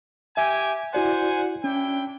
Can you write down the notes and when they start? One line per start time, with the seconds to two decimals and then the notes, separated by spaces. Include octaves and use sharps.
0.37 G4 E5 G#5
0.94 E4 F#4 C5 D5 F#5 G#5
1.64 C#4 D4 E4 G5